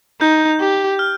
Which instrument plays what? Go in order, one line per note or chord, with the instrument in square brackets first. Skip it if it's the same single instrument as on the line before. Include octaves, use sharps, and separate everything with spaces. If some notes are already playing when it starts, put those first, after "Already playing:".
[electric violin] D#4 [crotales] G6
[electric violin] G4
[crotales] F6